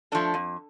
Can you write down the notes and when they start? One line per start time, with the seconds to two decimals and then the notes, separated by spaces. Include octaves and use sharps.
0.12 F3 A3 D4 A4
0.34 F2